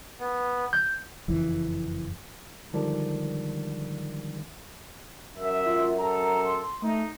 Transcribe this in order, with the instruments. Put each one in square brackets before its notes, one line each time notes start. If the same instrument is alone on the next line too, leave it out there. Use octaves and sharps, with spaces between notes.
[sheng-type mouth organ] B3
[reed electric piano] G6
[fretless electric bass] F#1 F2 E3
[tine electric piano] D3 D#3 F3 G3 G#3 D4
[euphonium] F#2 [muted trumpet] E5
[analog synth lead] F4
[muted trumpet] A4 [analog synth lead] A#5
[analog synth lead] C6
[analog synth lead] A3 [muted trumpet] D#4